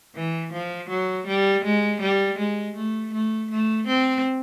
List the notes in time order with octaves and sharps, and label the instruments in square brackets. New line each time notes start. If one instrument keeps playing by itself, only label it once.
[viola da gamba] E3
F3
F#3
G3
G#3
G3
G#3
A3
A3
A3
C4